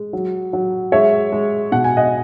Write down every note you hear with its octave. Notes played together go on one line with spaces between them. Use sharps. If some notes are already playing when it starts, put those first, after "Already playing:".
Already playing: G#3
F#3
F#3
G#3 C#5 E5
G#3
B2 F#5
G#5
D#5 F#5